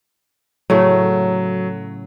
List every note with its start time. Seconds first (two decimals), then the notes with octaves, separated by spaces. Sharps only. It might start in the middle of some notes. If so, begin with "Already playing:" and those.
0.70 A2 C#3 F#3 A3